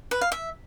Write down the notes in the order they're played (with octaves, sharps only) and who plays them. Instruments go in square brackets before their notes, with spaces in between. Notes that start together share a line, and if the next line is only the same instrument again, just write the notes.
[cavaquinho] B4
F5
E5